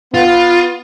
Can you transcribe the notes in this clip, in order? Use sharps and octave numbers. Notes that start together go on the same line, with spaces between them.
B3 F4